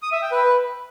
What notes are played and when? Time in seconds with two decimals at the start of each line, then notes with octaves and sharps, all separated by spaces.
0.02 D#6
0.12 E5
0.22 G5
0.32 B4